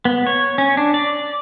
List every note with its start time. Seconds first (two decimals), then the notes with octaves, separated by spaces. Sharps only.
0.05 B3
0.27 C#5
0.58 C#4
0.77 D4
0.94 D5